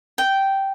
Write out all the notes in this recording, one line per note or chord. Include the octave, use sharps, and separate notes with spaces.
G5